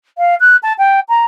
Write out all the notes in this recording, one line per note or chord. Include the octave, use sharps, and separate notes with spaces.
F5
F#6
A5
G5
A#5